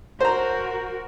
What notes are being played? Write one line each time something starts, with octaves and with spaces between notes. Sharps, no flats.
F#4 A#4 C5 A#5